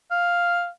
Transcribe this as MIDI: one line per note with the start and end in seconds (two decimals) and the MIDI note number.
0.11 0.67 77